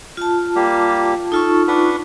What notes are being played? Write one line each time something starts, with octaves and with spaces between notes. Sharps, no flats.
F4 A5
G3 A#3 G4
D#4 F4 A4 C#6
D4 B4 F#5